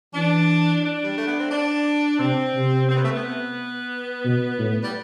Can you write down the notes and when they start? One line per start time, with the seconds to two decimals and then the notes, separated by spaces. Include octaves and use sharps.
0.14 E3 D4
0.82 D4
1.04 G3
1.16 A3
1.28 B3
1.40 C4
1.51 D4
2.19 C3 C4
2.54 C3
2.88 C4
2.96 B3
3.04 A3
3.11 B3
4.25 B2
4.59 A2
4.84 G3